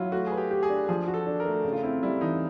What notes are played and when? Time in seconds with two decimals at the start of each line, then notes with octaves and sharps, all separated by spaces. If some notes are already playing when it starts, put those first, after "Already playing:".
Already playing: F#3 E4 F4
0.12 A3 F#4
0.27 G#4 B4
0.37 G4
0.51 G4
0.63 G#4
0.69 D4
0.89 F3 G#4
1.08 F#4
1.14 A4
1.26 D4
1.40 A#4
1.46 A3
1.64 C#3
1.73 F4
1.83 C4 E4
2.03 G3 E4
2.21 E3 D#4